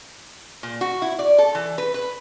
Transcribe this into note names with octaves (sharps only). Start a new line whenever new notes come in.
A#2
F#4
E4
D5
A4
E3
B4
B4